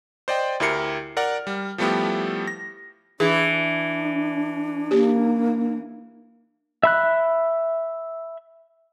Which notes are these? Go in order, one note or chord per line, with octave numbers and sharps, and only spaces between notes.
C5 D5 D#5 G5
D2 E4 G4 A#4 C7 C#7
A#4 D5 F#5 F6
G3
F3 G3 A3 B3 E4 G4
A#6
E3 D4 G#4
A#3 G4
E5 B5 F#6